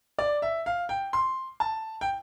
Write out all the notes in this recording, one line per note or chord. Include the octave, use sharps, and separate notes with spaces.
D5
E5
F5
G5
C6
A5
G5